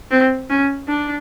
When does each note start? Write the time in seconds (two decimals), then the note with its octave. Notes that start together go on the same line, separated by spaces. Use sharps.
0.11 C4
0.50 C#4
0.88 D4